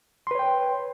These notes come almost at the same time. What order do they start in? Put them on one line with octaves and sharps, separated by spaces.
C6 B4 C#5 G5